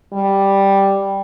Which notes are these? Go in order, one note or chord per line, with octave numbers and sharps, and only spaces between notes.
G3